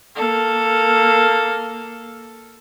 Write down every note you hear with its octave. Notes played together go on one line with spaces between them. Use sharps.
A#3 A4